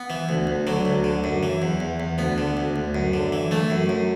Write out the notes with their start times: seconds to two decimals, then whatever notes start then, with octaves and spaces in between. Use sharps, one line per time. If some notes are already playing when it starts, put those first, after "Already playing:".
Already playing: B3
0.10 E3
0.29 D2
0.47 D2
0.67 D3 F#3
0.85 D2
1.04 D3
1.24 F#2
1.43 E3
1.62 E2
1.80 E2
2.00 E2
2.18 D2 B3
2.38 D3
2.57 D2
2.76 D2
2.95 F#2
3.14 D3
3.32 E3
3.51 E3 A3
3.70 F#2
3.89 F#2